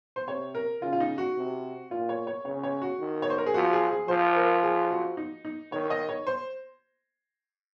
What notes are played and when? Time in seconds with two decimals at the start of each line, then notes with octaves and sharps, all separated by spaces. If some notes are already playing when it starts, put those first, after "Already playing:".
0.16 C5
0.27 C3 C#5
0.55 A#4
0.82 C#3 F4
0.93 F4
1.00 D#4
1.18 F#4
1.37 C3
1.91 A#2 F4
2.09 C#5
2.27 C#5
2.45 C#3 C#5
2.63 C#5
2.82 F#4
3.00 D#3
3.22 C#5
3.30 C5
3.38 A#4
3.46 G#4
3.54 F3 F#4
3.73 G#4
3.91 G#4
4.08 F3 C5
4.36 A#4
4.63 G#4
4.91 F#4
5.17 D#4
5.45 D#4
5.72 D#3 C#5
5.90 D#5
6.09 C#5
6.27 C5